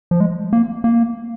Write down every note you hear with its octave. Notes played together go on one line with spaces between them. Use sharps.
F3
G#3
A#3
A#3